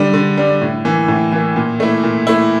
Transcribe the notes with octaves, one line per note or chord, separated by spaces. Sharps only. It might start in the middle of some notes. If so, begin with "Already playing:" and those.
Already playing: D3 G3 D4
D3
G3 D4
A2
E3 A#3
A2
E3 A#3
A#2
A3 E4
A#2
A3 E4